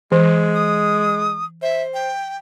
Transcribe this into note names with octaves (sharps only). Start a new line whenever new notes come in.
E3 G#3
D#6
C5 E5
G5